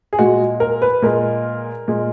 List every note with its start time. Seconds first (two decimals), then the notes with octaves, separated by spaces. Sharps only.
0.13 G#4
0.19 A#2 G#3 F#4
0.60 A#4
0.82 B4
1.02 A#2 G#3 A#4
1.88 A#2 G#3